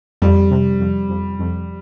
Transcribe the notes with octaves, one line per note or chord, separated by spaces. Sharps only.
F2 G3
C3
F2
F2
F2